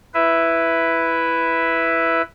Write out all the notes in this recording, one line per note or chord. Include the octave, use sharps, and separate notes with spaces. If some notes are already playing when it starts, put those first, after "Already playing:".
E4 B4 E5